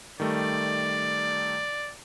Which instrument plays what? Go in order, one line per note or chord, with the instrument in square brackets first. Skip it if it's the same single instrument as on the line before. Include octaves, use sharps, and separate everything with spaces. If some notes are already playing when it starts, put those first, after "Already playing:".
[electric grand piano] D#3 G3 A3 [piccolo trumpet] D5